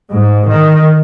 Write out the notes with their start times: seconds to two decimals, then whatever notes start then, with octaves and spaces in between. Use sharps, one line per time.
0.10 G#2
0.47 D#3